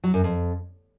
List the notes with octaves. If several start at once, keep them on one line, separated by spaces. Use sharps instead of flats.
F#3
F#2
F2